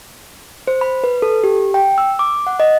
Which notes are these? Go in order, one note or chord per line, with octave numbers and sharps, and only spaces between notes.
C5
B5
B4
A4
G4
G5
E6
D6
F#5
D#5